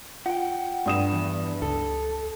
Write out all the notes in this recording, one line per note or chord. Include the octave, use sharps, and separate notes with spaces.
F4 F#5 G5
G2 D#6 E7
E2
C#2 A4